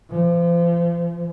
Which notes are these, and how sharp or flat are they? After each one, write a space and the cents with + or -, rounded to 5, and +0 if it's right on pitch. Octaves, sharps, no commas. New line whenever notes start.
F3 -35